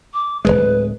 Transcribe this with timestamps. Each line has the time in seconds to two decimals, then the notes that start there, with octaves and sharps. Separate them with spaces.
0.13 D6
0.45 D1 B1 G#3 B4